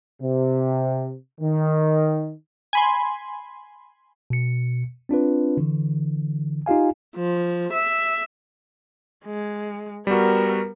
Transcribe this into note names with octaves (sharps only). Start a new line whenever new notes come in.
C3
D#3
G#5 B5 C6
B2 C#7
C4 D4 F4 B4
D3 E3
D#4 F4 G4 F5 G#5
F3
E5
G#3
G3 B3 F#4 A#4